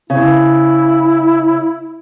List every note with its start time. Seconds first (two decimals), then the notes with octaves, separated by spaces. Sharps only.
0.10 C#3 E4